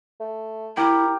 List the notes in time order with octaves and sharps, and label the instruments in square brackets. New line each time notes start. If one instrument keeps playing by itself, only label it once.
[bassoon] A3
[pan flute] E4 [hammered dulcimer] G4 [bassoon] A#4